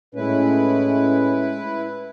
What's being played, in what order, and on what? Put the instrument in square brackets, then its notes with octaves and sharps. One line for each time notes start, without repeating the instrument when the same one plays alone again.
[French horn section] A2 G#3 C#4 [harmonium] E4 B4